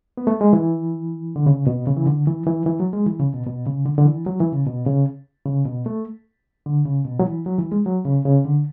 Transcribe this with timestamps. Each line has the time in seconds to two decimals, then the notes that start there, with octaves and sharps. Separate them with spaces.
0.18 B3
0.27 A3
0.41 G#3
0.53 E3
1.36 D3
1.46 C#3
1.67 B2
1.87 C#3
1.96 E3
2.07 D3
2.27 E3
2.46 E3
2.66 E3
2.80 F#3
2.93 G#3
3.06 E3
3.20 C#3
3.33 B2
3.46 B2
3.67 C#3
3.86 D3
3.98 D3
4.06 E3
4.26 F#3
4.40 E3
4.52 C#3
4.66 B2
4.87 C#3
5.46 C#3
5.66 B2
5.86 A3
6.66 D3
6.86 C#3
7.05 B2
7.19 F#3
7.26 E3
7.46 F#3
7.58 E3
7.72 G#3
7.86 F#3
8.05 C#3
8.25 C#3
8.45 D3